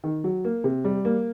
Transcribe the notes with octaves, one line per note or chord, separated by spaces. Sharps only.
D#3
F#3
A#3
C3
G3
A#3